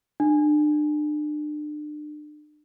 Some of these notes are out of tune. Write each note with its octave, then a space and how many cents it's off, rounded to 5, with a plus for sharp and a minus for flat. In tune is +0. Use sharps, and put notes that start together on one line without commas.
D4 +35